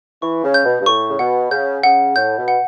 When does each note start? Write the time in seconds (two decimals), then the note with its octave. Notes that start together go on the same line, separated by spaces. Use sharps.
0.22 E3 C#6
0.43 C#3
0.54 G6
0.65 B2
0.81 G2
0.86 A2 C#6
1.09 C#3
1.19 B2 F#5
1.51 C#3 G6
1.84 C#3 F#5
2.16 A2 G6
2.38 B2
2.48 F#5